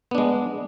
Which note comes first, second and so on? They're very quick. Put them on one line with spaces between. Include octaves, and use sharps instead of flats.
B3 D4 G#3